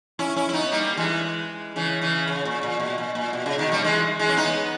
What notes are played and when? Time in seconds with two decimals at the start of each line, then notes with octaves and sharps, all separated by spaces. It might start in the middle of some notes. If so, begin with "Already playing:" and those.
0.19 C#4 E4
0.36 C#4 E4
0.49 E4
0.53 B3 D#4
0.72 G3 A#3
0.97 E3 G#3
1.76 C#3 E3
2.02 C#3 E3
2.27 C#3
2.45 A#2
2.63 A#2
2.80 B2
2.98 A#2
3.15 A#2
3.33 B2
3.46 C#3
3.58 B2 D#3
3.72 G3 A#3
3.84 E3 G#3
4.19 E3 G#3
4.29 C#4
4.37 B3 D#4